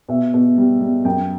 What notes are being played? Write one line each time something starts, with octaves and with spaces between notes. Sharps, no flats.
B2 E5
B2
G3
G3
F#2 G5